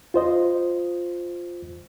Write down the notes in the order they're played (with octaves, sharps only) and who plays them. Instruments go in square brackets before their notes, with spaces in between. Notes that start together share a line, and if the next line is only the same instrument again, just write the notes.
[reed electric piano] F4 C5 D#5